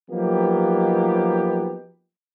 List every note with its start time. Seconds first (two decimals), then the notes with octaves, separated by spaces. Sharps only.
0.10 F3 F#3 A#3 B3 D#4 G4